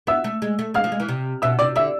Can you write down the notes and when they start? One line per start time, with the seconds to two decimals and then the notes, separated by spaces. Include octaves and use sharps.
0.07 B3 E5 E6
0.24 A3
0.42 G#3
0.59 A3
0.74 G#3 F5 F6
0.84 F3
0.92 G#3
1.00 E3
1.09 C3
1.42 B2 E5 E6
1.59 C3 D5 D6
1.76 D3 E5 E6